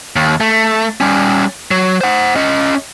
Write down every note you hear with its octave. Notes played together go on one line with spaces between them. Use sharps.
D#2
A3
G3 C#4
F#3
C5 F#5
C#4 D#5